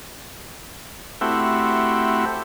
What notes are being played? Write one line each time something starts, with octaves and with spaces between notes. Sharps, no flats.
A3 C4 E4 F#4 G4